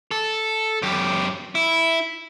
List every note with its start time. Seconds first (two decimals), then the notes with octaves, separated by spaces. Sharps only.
0.11 A4
0.82 F#2 G4
1.55 E4